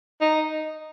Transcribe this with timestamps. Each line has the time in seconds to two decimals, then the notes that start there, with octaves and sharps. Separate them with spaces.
0.21 D#4